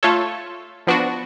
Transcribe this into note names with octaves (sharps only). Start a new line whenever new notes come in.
A3 F4 A4 C#5
F3 B3 D4 F#4